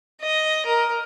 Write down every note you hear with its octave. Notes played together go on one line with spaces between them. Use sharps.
D#5
A#4